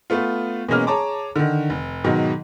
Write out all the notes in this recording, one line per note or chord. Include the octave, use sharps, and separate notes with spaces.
A3 B3 F4
B2 E3 G#3 A#3 C#4 F6
G#4 C#5 A5 A#5 D6
D3 D#3
F1
G#2 B2 D#3 F#3